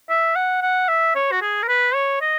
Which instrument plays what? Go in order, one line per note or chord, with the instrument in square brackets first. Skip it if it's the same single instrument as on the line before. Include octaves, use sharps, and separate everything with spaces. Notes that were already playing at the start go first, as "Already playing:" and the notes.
[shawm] E5
F#5
F#5
E5
C#5
F#4
G#4
A#4
B4
C#5
D#5